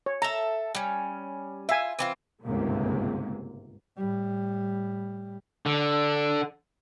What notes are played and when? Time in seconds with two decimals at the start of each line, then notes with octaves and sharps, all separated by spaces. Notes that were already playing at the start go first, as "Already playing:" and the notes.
0.06 C#5
0.22 A4 E5 A#5
0.75 G3 C#4
1.69 F4 E5 G#5
1.99 E3 C4 F4
2.43 G1 C#2 G#2 C3 A#3
3.97 A2 G3
5.66 D3